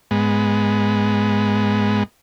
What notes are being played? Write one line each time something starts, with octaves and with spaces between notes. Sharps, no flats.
G#2 G#3 B3